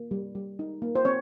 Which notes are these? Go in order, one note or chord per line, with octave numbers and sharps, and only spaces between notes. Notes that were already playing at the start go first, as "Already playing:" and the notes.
Already playing: A#3
G3
G3
D#4
A#3
C5
C4 C#5